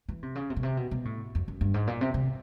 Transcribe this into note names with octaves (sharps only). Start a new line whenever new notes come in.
E3
C3
C#3
C3
B2
C3
B2
B2
A2
F2
F#2
G2
G#2
A#2
C3
C3